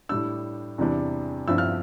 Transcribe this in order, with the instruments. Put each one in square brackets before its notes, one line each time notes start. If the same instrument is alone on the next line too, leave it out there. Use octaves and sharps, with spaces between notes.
[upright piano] A2 G3 D4 E6
E2 C3 E3 G3 D4
G1 G2 F3 C4 E4 E6
F6